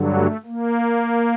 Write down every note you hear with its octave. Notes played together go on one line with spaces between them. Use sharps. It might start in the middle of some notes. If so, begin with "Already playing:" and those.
Already playing: G2 D3 F#3
A3
A#3